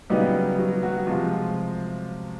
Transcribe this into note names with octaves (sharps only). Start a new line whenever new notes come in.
C#3 F#3 G3 B3 D#4 G4
F#3 F#4
F#3 F#4
C3 F3 G#3 F4